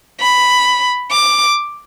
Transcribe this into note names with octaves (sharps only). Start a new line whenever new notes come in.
B5
D6